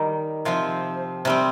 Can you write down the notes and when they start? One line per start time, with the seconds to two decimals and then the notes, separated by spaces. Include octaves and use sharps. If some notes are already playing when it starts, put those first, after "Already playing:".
Already playing: D#3 G3 D#4
0.45 C3 F3 C4
1.25 C3 G3 C4